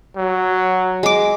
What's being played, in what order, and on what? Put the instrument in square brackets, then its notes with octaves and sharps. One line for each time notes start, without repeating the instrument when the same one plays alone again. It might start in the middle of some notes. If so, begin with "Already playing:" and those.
[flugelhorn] F#3
[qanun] G#3 D6